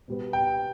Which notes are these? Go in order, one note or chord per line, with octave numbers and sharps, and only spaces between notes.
B2 G3 B3
G5